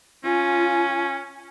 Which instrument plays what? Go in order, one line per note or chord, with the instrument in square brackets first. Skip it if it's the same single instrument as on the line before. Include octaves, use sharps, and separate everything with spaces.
[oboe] C#4 [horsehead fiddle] F4 [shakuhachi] G#5